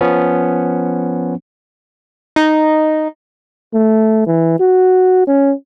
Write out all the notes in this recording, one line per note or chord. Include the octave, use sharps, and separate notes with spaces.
F3 B3 C#4
D#4
A3
E3
F#4
C#4